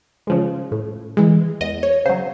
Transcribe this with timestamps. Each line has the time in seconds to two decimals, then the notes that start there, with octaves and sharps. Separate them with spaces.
0.27 C#3 F3 G#3
0.72 A2
1.17 E3 G#3
1.60 E2 D#5
1.83 C#5
2.06 C#3 C5
2.09 F#3